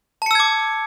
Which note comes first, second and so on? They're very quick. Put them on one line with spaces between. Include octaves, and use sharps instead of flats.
A5 C#7 E6 G#6 D6